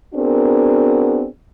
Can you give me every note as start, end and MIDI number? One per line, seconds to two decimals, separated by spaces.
0.14 1.25 59
0.14 1.25 60
0.14 1.25 62
0.14 1.25 66
0.14 1.25 68
0.14 1.25 70